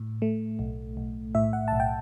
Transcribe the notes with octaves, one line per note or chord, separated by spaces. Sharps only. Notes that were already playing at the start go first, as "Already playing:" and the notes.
Already playing: A2
A3
B1
B1
A2 E5
F#5
B1 A5
G5